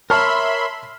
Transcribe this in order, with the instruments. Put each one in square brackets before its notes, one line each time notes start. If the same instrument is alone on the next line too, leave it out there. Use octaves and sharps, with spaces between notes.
[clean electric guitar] A#4 C#5 [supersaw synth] E5 B5 C6 [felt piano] A5 F6